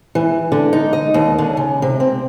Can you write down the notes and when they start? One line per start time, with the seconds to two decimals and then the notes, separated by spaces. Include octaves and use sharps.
0.15 E3
0.52 D3
0.73 D#4
0.93 D#5
1.14 D#2
1.38 D3
1.57 C#3
1.82 C3
2.00 C4